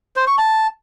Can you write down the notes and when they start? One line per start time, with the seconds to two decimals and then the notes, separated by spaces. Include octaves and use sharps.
0.16 C5
0.27 C#6
0.38 A5